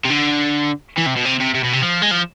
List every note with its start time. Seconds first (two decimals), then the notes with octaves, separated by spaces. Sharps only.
0.05 C3
0.10 D3
0.97 E3
1.06 C3
1.16 B2
1.25 C3
1.40 C3
1.55 C3
1.64 B2
1.73 C3
1.82 F3
2.02 G#3
2.11 F3